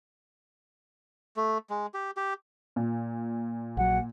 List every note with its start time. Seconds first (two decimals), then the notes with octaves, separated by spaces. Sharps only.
1.37 A3
1.70 G#3
1.94 G4
2.17 G4
2.76 A#2
3.77 A#1 F#3 F#5